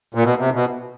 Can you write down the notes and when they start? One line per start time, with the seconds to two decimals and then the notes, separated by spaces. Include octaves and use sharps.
0.15 A#2
0.23 B2
0.39 C3
0.54 B2